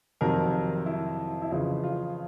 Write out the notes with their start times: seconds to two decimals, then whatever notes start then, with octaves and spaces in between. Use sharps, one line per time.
0.21 F2 C3 D#3 F#3 A#4
0.54 A#4
0.86 E4
1.42 E4
1.51 F2 C#3 E3 F4
1.84 F4